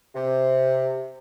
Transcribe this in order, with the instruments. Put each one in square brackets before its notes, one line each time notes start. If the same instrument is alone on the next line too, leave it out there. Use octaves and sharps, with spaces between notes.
[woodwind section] C3